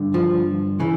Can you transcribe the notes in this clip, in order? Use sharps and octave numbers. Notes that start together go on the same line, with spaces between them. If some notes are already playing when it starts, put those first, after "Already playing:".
Already playing: G2 D3
F3
C#3 E3